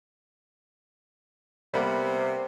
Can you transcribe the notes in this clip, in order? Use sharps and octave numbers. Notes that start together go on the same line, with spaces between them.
C3 G3 A#3 B3